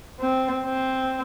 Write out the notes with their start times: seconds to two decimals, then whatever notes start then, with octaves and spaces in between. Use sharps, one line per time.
0.20 C4
0.64 C4